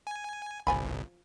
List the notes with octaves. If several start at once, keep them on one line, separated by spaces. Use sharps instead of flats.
G#5
G1 C2 F3 G#5 B5